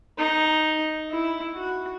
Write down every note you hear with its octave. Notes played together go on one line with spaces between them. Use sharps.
D#4
E4
F#4